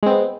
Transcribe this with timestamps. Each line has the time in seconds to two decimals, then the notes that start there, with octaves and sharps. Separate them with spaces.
0.03 G#3
0.06 C4
0.10 B3